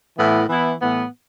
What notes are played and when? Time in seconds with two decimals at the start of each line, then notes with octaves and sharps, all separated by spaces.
0.18 A2 E3 B3 E4
0.49 E3 B3 E4
0.80 A2 E3 B3